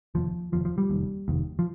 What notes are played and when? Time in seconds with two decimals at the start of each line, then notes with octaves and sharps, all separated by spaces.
0.15 F1 D#2 F3
0.52 F1 D#2 F3
0.65 F3
0.78 G3
0.90 F1 D#2
1.28 F1 D#2
1.59 F3